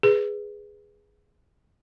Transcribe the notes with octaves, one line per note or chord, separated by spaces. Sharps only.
G#4 B4